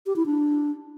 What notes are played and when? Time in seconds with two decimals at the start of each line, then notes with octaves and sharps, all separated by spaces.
0.06 G4
0.16 E4
0.26 D4